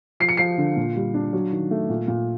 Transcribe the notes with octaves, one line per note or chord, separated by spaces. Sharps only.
F3 C7
C#7
F3 C7
D3
A#2
G3
D4
F#3
D#3
A3
A#2
A#2